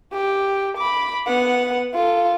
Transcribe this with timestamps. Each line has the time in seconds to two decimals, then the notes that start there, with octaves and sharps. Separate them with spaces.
0.13 G4
0.77 B5 D6
1.27 B3 F#5
1.94 F4 A4